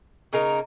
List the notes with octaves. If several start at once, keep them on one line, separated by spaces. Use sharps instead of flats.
C#3 A#3 D#4 A#4